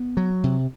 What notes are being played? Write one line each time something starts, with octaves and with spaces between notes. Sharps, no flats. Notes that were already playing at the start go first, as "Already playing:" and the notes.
Already playing: B3
F#3
C3